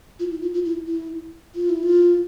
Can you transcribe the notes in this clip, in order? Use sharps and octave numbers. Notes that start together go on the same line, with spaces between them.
F4
E4
F4
F4
E4
E4
F4
E4
F4